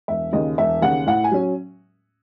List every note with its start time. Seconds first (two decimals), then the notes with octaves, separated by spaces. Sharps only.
0.08 E1 E5
0.32 D#2 C#3 D#5
0.58 E1 E5
0.82 D#2 C#3 F#5
1.07 A2 F#5
1.24 G#5
1.31 F#3 C#4